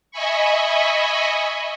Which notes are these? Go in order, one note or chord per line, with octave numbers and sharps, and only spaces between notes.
D#5 E5 G#5 B5 C#6